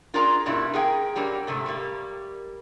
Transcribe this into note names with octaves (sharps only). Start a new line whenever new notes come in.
D4 F4 G#4 A#4 D5 A#5
G2 B2 D4 E4
A#3 G#4 A#4 G5
F#3 G3 A#3 D4
G#2 C3 A3
G3 A#3